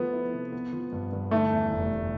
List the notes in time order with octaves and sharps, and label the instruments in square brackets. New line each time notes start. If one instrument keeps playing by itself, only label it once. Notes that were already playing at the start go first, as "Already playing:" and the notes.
Already playing: [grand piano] F3 A3 [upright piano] B3
[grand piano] E4
C3
B3
F3
G2
G2
[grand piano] D3 [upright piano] A3
[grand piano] E2
F1
F1